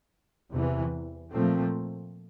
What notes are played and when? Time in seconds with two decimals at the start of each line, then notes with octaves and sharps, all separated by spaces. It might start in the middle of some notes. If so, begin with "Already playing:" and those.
0.50 E2 C3 E3
1.31 A#2 F3 A3 C4